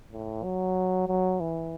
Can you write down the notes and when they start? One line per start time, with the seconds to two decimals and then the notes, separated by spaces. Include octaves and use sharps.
0.12 A2
0.44 F#3
1.08 F#3
1.40 E3